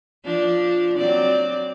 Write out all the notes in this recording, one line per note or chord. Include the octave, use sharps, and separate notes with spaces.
F3 D4
F#3 C4 D5